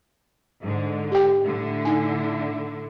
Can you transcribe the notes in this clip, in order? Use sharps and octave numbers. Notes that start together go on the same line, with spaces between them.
G#2 D3
G4 G5
A2 D3 E4
D#4 G#5